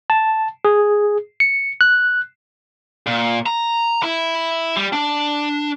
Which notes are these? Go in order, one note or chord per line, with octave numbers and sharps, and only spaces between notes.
A5
G#4
C#7
F#6
A#2
A#5
E4
G3
D4